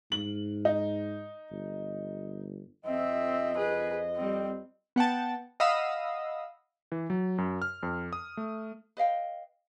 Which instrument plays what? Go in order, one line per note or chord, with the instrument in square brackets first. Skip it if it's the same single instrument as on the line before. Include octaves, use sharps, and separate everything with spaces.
[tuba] G#2 [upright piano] F#7
[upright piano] D#4
[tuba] G1
[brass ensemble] F2 D#5 [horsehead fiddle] C4 E5
[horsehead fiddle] G#4 B4
G3 C4
[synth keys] B3 F#5 G5 A5
D#5 F5 F#5 B5 D#6 E6
[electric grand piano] E3
F#3
F#2
F6
F2
D#6
A3
[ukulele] B4 D#5 F5 G5